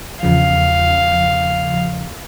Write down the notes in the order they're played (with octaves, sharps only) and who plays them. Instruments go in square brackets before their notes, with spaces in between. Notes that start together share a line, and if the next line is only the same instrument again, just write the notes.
[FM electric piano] E2 C#3 F3 [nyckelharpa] F5